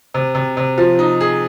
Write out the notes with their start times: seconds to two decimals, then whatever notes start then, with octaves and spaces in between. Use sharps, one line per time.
0.14 C3
0.35 C3
0.57 C3
0.78 F3
0.99 D#4
1.21 G#4